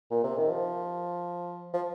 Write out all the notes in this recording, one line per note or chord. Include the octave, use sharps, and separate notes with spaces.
A#2
C3
D#3
F3
F3